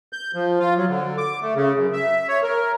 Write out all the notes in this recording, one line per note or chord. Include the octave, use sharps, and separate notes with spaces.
G6
F3
F4
F#3
D3
D6
A3
C#3
F#2
E5
C#5
A#4